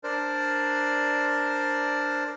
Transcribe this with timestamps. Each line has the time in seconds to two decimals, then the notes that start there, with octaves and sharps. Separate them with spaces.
0.04 D4 A#4 C5 D5